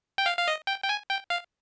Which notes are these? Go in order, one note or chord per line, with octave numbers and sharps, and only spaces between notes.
G5
F5
F5
D#5
G5
G5
G#5
G5
F5